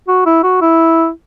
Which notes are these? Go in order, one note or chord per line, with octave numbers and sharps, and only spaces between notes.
F#4
E4
F#4
E4